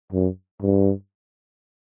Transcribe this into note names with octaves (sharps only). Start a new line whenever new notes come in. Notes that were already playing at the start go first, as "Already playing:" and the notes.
F#2
G2